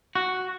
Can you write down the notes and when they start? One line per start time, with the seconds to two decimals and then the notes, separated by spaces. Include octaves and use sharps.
0.15 F#4